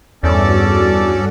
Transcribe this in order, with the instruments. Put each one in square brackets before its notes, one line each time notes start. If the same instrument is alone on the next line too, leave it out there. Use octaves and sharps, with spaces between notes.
[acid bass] E2 [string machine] G2 F#4 [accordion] C#4 A4 D5